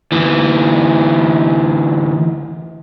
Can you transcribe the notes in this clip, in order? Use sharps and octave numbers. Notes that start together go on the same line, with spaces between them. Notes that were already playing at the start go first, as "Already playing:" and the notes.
D2 E3